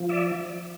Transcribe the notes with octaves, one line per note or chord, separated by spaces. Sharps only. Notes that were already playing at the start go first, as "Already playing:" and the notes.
Already playing: F3
D5 E5